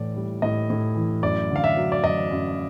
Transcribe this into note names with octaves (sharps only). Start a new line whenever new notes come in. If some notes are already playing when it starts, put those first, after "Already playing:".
Already playing: A2 E3 D5
G3
A2 D#5
A2
E3
F#2 D5
D3
F5
E5
F#3
D5
F#2 D#5
F#2